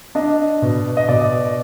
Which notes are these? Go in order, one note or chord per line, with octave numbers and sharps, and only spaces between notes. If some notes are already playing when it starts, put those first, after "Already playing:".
D4 D#5
B2
D#5
B2 D5